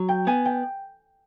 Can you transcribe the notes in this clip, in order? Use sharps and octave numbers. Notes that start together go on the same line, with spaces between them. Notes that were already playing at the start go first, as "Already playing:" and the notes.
Already playing: F#3
G5
B3 G#5
G5